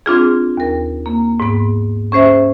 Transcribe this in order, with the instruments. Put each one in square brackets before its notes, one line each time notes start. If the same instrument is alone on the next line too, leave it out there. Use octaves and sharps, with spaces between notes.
[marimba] C4 D4 F4 G#4
D#2 A#4
A#3
G#2 B3
C#4 G#4 C5 E5